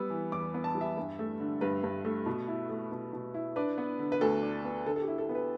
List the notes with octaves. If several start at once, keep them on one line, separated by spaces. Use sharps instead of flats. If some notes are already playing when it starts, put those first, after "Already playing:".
Already playing: G3 B3 E6
E3
E2 D6
B3
A5
G3
E5
G2
A3
D3
G2 B4
G2
A3
B2
E4
A3
B2
B2
E4
D4 B4
B3
D3
B4
D2 A4
D4
B3
D3 A4
A4
G4
E4
A4
B3
B4